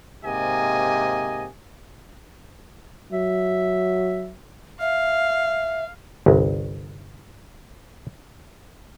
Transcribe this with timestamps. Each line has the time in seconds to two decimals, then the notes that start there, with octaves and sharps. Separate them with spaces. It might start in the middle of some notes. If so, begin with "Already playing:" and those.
0.25 G#2 C3 A#3 G4 D#5 G#5
3.13 F#3 E5
4.81 E5 F5
6.26 G1 C2